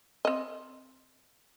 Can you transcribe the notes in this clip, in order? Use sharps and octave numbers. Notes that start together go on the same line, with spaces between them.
C4 D#5